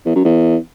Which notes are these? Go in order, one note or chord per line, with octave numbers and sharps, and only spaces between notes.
E2
F#2
E2